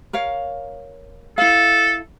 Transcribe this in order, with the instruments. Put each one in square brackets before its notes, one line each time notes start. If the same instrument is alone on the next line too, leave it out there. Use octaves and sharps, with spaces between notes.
[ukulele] A#4 C#5 F5
[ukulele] E4 F5 [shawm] A4